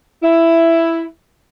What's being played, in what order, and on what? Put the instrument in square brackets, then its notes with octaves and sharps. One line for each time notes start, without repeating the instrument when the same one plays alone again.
[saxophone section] E4